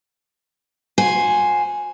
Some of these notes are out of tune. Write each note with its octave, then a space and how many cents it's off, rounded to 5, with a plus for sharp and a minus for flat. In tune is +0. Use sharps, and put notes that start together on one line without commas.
F#4 -35 C5 +0 G#5 +0